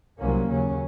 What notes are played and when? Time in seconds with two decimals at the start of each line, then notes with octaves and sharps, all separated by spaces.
0.19 C2 C3 F#3 A#3 C#4
0.47 D#2 C#3 F#3 C#4